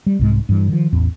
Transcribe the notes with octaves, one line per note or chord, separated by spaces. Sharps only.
G3
C2 G#2 G#3
G2 E3
D#3 F3
A1 E2